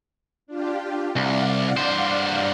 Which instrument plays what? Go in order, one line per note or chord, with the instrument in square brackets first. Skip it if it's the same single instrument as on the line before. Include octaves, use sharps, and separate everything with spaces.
[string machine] D4 F4 G4
[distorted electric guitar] C2 [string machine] D5 F5 F#5
[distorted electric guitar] G2 C5